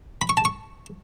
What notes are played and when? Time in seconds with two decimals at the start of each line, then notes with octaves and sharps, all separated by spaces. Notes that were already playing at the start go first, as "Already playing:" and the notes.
0.22 B5
0.29 C#6
0.37 A5
0.45 C#6